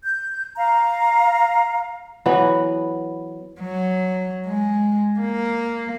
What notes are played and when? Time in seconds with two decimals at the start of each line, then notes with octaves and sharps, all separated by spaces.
0.04 G6
0.56 F5 A#5
2.26 E3 F#3 B3 B4
3.60 F#3
4.46 G#3
5.20 A#3